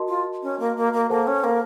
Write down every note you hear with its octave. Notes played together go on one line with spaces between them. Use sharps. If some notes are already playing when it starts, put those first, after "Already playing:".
Already playing: F#4 A#4 D#5 A5 C6
F4
C#4
A#3
A#3
A#3
A#3 A4 C5 F#5 A5
C#4
A#3